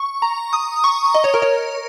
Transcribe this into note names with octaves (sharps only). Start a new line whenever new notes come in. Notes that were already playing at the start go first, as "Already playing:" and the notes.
Already playing: C#6
A#5
D#6
C#6
D#5
C#5
A#4
C#5